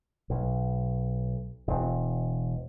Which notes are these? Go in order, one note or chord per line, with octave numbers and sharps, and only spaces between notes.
B1
E1